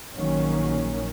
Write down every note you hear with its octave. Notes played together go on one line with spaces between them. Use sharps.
A#1 D#3 F#3 A#3 C#4